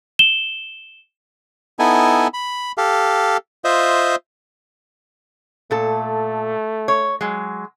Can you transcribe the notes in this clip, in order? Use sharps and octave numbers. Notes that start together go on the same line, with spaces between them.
E7 G7
B3 D#4 E4 A4 G#5
B5
G4 A4 F5
F4 C5 D#5 E5
A#2 A3 A4
C#5
F#3 G#3